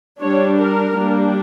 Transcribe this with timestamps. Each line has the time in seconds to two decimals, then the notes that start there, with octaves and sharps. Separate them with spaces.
0.21 G3 D4 C#5
0.58 A#4
0.96 G3 A#3 D4